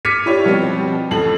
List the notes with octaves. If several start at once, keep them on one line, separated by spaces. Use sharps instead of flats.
D6 F6 G#6 B6 C#7 D#7
E4 G4 C#5 D5
B2 F3 G3 C4 G4
A1 F2 A4 F#7